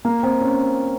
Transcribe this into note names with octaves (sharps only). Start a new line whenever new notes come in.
A#3
C4
C#4